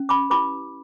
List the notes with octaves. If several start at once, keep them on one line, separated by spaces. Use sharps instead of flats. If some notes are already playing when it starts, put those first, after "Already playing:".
Already playing: C#4
B5 D6
E4 G4 B4 B5 D6